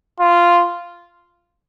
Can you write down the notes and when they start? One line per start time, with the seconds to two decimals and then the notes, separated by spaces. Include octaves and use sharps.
0.20 F4